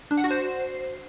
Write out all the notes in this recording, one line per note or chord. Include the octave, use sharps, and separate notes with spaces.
D4
F#5
F#4
C5